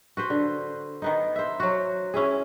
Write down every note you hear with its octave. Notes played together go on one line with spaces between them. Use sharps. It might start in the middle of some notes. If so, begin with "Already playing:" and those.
F#4 B4 C5
D3
D#3 B3 D#4
C5 E5
F#3 F#4
C#4 E4 G#4